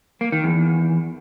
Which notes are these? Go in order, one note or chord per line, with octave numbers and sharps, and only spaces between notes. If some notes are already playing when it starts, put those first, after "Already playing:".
A#3
D#3
E2